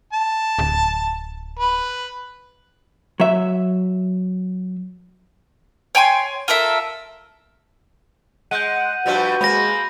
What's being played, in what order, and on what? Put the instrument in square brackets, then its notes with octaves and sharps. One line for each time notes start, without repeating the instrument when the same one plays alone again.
[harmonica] A5
[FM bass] D1
[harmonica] B4
[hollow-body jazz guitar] F#3 E5
[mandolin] C#5 G5 G#5 C6
F4 A4 A#4 E5
[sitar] G#3 [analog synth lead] F#5 [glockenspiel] G6 D#7
[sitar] G2 F3 G3 [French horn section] F#4 B4
[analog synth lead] G#3 [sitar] A#3 C4 [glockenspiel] B5 A#6